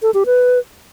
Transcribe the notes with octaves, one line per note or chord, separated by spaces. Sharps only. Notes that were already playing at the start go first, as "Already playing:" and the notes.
A4
G4
B4